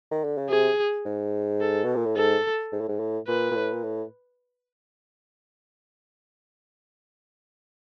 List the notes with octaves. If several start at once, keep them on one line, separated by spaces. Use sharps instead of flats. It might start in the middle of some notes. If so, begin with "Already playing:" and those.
D#3
D3
C#3
C3 G#4
G#2
A4
B2
A#2
A2
G#2 A4
G#2
A2
G#2
A2
A#2 B4
A#2
A2
A#2
A2